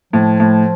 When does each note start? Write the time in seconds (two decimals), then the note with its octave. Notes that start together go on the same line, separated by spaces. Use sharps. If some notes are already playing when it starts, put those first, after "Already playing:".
0.13 A2 F3
0.40 A2